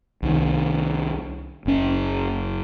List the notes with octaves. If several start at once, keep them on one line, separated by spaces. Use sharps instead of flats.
C2 C3 D#3
F#1 C#4